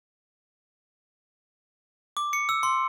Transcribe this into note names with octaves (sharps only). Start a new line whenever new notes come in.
D6
C#7
E6
C6